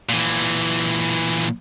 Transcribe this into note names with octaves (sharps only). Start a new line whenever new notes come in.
A#2 E3